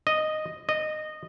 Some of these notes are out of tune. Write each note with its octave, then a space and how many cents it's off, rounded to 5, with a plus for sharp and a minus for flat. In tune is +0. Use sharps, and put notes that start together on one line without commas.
D#5 -5
D#5 -15